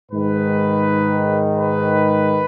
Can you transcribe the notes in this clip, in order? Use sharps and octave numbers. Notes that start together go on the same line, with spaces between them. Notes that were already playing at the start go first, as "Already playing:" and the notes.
G#2 D#3 B4
B4